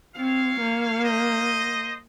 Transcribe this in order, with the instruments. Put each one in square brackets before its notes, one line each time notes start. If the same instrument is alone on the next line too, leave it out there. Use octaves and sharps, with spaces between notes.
[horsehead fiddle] C4 [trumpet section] C#5 F5
[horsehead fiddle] A#3
[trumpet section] C5 D#5